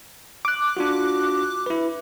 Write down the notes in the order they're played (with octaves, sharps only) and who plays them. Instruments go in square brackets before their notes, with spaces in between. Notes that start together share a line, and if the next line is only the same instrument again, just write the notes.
[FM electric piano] D6 F#6
[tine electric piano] D4 F4 F#4
E4 B4